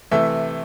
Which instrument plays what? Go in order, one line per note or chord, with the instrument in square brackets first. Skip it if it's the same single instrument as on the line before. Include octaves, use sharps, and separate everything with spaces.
[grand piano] C3 E3 A3 E5